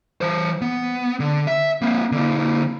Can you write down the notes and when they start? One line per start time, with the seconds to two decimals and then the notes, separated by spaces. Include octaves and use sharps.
0.21 E3 C5
0.62 B3
1.20 D3
1.47 E5
1.82 A#3 C4
2.12 D3 A#3